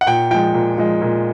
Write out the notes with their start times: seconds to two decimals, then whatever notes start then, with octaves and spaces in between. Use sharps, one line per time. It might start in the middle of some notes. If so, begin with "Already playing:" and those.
0.01 F#5
0.07 A#2 G5
0.31 F3 G#3 G5
0.54 A#2
0.78 F3 G#3
1.02 A#2